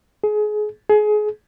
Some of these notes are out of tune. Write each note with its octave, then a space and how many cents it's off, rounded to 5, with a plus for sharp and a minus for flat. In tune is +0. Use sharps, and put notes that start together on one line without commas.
G#4 +25
G#4 +25